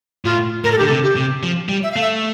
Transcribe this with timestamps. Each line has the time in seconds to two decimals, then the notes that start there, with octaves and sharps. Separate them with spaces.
0.25 A2 F4
0.64 A2 A#4
0.72 A4
0.78 G4
0.81 D3
0.86 A4
0.90 C3
1.03 G4
1.16 C3
1.43 F3
1.69 G3
1.83 E5
1.92 F5
1.96 A3 E5